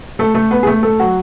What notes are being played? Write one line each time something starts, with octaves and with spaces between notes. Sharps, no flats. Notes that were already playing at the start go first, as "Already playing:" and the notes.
A3 A4
A3 A4
B3 B4
G#4
A3 A4
A3 A4
F#3 F#4